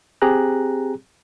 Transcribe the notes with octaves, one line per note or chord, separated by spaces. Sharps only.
C4 G4 G#4 A#5 F#6